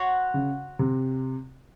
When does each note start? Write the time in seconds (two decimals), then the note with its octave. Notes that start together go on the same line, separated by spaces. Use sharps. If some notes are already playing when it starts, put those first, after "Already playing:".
Already playing: F#4 C#5 F#5 C6
0.34 C#3
0.79 C3